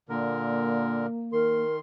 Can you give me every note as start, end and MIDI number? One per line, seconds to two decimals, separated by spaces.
0.09 1.06 46
0.09 1.06 50
0.09 1.64 58
0.09 1.06 70
1.33 1.79 51
1.33 1.77 70
1.33 1.79 84